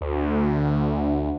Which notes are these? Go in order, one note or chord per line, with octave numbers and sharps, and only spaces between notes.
D2